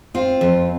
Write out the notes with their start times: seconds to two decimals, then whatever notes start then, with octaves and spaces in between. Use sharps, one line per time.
0.14 C4 F4
0.41 F2